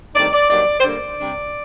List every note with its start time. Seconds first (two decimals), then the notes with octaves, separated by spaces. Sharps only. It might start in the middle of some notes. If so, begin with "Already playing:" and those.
0.14 G2 D#3 A3 C4 D#4 D5
0.33 D5
0.50 G2 F#3 A#3 D#4 D5
0.80 C5
0.84 D3 G3 A#3 D5
1.20 C3 G3 D4